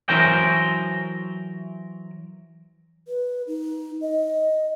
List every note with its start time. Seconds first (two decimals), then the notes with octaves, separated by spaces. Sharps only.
0.09 E3 F#3 A#4 C5 G5
3.08 B4
3.47 D#4
4.01 D#5